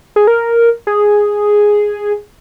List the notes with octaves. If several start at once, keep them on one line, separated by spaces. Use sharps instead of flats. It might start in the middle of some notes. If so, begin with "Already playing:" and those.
G#4
A#4
G#4